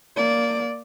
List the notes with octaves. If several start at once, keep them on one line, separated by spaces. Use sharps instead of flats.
A#3 D5